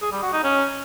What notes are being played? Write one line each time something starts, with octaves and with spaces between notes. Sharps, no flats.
G#4
G3
F#4
D#4
C#4